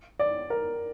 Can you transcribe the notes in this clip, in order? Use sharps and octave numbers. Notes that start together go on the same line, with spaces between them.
D5
A#4